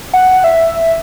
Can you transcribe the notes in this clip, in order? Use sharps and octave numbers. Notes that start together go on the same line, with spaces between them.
F#5
E5